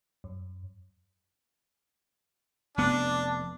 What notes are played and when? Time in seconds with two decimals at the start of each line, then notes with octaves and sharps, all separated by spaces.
0.24 F#2
2.78 F1 B3 D4